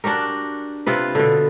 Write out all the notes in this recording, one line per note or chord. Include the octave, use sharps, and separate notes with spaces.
D4 F#4 G4 A#4
C3 F4 B4
B2 D3